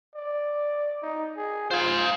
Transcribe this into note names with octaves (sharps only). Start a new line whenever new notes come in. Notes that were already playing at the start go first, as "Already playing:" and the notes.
D5
D#4
G#4
F4 C5 G#5